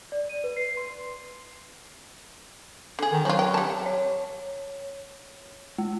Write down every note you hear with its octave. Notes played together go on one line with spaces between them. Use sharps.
D5
D#7
B4
C7
C6
D3 G#4
D#3
F3 F#3 F4
G5
G3 A5
C#5
G#3